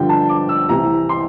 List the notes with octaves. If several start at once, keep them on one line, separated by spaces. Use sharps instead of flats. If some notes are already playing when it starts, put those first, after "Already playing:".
Already playing: G2 D3 F3 G5
A5
D6
E6
C2 C3 E3 A#5
C6